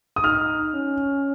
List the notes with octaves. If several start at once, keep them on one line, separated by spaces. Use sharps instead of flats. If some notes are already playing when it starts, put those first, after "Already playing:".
D#6
D#4 F6
C#4